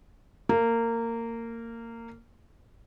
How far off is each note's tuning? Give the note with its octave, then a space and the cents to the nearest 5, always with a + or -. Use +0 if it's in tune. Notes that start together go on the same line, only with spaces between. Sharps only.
A#3 -20